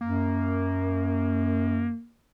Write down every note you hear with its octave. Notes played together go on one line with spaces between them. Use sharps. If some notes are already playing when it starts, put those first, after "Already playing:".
F#2 A#3